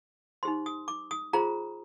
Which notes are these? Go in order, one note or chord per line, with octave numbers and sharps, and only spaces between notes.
D#4 G4 C5 C6
D#6
D6
D#6
F4 G#4 C5 A#5